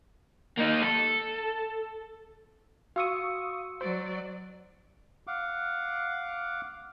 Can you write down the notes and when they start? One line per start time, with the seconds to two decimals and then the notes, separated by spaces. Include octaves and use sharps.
0.59 A#3 D#4
0.83 A4
2.96 F#4 F5 C#6 D#6 E6 C#7
3.81 F#3 C5 D5
5.27 F5 F#5 D6